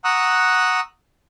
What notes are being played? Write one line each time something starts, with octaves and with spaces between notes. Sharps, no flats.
F#5 A#5 C#6 D#6 E6 F#6